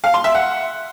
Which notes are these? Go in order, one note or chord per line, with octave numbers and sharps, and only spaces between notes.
F5
C6
E5
F#5